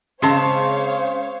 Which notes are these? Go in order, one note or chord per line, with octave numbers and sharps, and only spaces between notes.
C#3 G#3 C4 C5 C#5 F5 A5